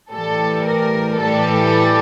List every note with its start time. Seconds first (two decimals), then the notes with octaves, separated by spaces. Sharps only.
0.11 A2 E3 G3 A4
0.65 A#4
1.18 A2 E3 G3 A4